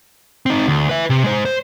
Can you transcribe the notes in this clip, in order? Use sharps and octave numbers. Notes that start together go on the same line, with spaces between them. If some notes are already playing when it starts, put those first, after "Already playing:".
C4 D#4
D2
B4 E5
C3
G#3 C5
C5